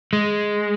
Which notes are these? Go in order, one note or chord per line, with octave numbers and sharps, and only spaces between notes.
G#3